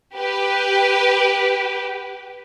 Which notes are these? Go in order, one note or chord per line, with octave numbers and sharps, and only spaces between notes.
G4 B4